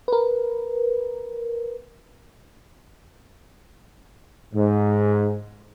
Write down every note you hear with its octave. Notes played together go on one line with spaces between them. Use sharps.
A#4 B4
G#2